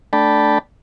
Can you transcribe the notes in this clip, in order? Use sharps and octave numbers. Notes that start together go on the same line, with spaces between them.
A3 D4 D5 G5 A5 B5